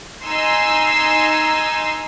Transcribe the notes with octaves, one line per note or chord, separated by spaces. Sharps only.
D#4 G#5 C6 E6